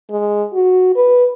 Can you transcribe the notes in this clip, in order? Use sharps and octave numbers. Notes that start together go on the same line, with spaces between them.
G#3
F#4
B4